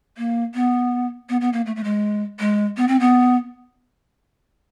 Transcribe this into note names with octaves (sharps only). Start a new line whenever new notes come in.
A#3
B3
B3
B3
A#3
A3
A3
G#3
G#3
B3
C4
B3